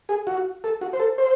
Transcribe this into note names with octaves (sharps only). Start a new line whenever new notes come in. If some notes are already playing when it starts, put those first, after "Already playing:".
G#4
F#4
A4
F#4
C5
A4
C5